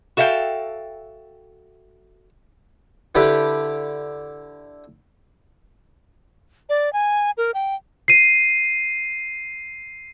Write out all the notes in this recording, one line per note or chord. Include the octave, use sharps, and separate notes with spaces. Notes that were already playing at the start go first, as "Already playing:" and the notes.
F#4 A4 E5 F5 G5
D3 D4 E4 G4 B4
D5
G#5
A#4
G5
C7 D#7